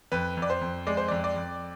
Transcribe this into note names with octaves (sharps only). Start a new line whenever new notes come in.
F2 B4
F2 D5
C5
F2
G#3 D5
C5
F2 D5
D5
F2